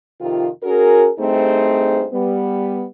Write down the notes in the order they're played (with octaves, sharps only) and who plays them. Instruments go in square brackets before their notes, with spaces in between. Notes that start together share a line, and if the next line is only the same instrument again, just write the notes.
[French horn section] F2 C3 D#3 F4
C#4 F#4 G#4 A#4
G2 A3 C4 D#4 G#4 C5
G3 B3